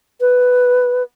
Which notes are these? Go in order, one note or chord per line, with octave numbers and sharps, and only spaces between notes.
B4